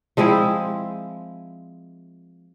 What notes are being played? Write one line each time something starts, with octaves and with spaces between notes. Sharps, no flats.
F3 G#3 C4 E4